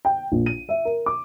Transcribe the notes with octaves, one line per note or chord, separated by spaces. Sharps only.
G5
A#1
D#7
E5
A#4
D6